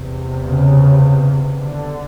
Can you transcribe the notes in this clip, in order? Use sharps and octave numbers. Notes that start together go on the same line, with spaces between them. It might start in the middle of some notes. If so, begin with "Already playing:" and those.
Already playing: E2 C3
C#3
D3